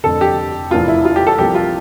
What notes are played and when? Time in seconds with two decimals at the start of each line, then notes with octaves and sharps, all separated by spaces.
0.04 F1 F2 D3 A4
0.21 G4
0.71 F1 E2 E3 A#3 F4
0.88 E4
1.05 F4
1.16 G4
1.27 A4
1.38 C2 C3 F3 A#3 G4
1.55 F4